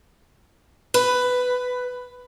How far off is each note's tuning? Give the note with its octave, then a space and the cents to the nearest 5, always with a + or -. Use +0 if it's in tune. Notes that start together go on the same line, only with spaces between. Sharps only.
B4 +10